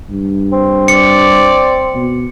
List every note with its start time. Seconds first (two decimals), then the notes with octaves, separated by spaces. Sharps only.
0.10 G2
0.52 C4
0.88 D5 C#7
1.95 B2